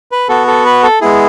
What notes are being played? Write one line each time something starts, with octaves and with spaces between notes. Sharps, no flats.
B4
B3 F#4 A4
A4
B4
A4
G#3 B3 E4 G#4